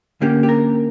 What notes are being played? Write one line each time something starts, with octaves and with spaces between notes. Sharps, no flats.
D3 A#3 C#4 G4
G4
A#4